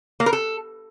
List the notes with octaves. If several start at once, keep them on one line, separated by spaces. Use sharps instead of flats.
A#3
A#4
A4